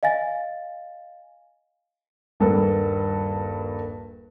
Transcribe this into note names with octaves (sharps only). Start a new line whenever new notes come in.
D#5 F5 G#5 A6
D#1 G2 A#3 A4 B4